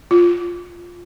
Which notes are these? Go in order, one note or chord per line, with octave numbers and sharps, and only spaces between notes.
F4